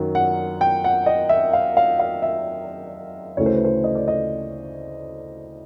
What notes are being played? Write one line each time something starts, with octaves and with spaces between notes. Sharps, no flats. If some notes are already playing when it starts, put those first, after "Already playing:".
Already playing: F#2 D#3 F#3
F#5
G5
F#5
D#5
E5
F5
F5
F5
E5
D2 C#3 E3 A3 C#5
C5
B4
C5
D#5
D5
D#5